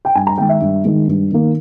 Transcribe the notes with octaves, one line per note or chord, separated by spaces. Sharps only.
G5
G2 G#5
A#5
D#3 G#3 G5
E5
G2
D#3 G#3
G2
D#3 A#3